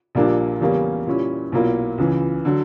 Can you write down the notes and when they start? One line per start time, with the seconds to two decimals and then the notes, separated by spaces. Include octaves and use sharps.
0.15 A#1 A#2 G3 A#3 D4
0.61 E2 C#3 G3 A#3 C#4
1.07 A#2 G3 C#4 E4
1.52 B1 A#2 A#3 E4
1.98 C#2 C#3 E3
2.45 D3 F#3